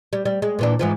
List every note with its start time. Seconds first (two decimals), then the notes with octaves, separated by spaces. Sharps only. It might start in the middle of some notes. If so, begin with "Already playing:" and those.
0.13 G3
0.25 G3
0.42 G#3
0.59 A#2 E3 D4
0.79 G#2 E3 F3